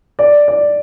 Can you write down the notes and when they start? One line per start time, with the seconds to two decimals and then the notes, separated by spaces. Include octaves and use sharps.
0.19 D5
0.48 D5